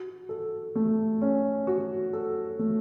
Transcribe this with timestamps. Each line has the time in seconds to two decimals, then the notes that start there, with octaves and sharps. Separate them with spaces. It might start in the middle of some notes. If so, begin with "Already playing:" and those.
Already playing: F#4
0.29 A4
0.75 A3
1.22 C#4
1.67 F#4
2.13 A4
2.59 A3